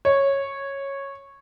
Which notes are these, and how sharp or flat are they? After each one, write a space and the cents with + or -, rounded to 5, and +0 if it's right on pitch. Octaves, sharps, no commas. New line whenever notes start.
C#5 -10